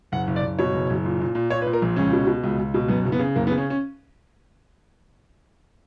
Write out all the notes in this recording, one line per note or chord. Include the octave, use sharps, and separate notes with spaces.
F#1 F#5
F#1
D5
F#1
B2 C#5
F#1
F#1
A#2
A#2
A#2
A#2 C#5
B4
A#2
A#4
A#1
C#2 C#4
B2
B2
C#2
C#2
B2
F#2 B3
F#1
B3
C#3
F#1 A#3
B3
C#3
C#4
C#4